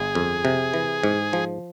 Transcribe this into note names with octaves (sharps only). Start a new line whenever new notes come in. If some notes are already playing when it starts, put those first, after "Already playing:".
Already playing: G1 G#4
F2
C3
E3
G#2
F3